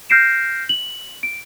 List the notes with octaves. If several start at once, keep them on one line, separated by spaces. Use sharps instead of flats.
F6 G6 A#6 C7 D7 E7
F#7
D7